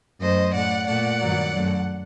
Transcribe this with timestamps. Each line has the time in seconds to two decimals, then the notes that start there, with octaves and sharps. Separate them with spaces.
0.20 F#2 F#3 A3 C5 D#5
0.53 A2 A3 D5 F#5
0.87 A#2 A3 D5 F#5
1.20 G2 D#3 F#3
1.53 F#2 F#3 A3